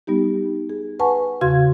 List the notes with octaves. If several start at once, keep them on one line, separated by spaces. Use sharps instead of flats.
G3 B3 D#4 G4
G#4
B4 F#5 G#5 A5 C#6
E2 C#3 F#4 F5 C6 G#6